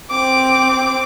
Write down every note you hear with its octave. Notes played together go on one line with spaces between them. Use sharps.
C4 D6